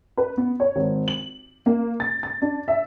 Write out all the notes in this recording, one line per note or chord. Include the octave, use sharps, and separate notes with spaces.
B4
B3
C#5
G#1
F#7
A#3
A6
A6
D4
E5